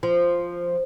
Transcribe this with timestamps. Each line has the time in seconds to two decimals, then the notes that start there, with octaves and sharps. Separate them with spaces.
0.03 F3